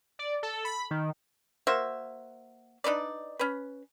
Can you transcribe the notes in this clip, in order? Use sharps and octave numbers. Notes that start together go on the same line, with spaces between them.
D5
A4
B5
D#3
A#3 F#4 C5 E5
D4 D#4 B4 D5
C#4 B4